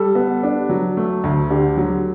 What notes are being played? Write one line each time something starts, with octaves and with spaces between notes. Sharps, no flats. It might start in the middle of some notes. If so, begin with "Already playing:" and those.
Already playing: G3 A4
B3
D4
F#3
A3
D2
D3 G4
F#3